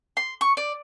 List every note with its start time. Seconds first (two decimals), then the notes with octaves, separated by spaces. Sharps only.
0.17 C6
0.41 C#6
0.57 D5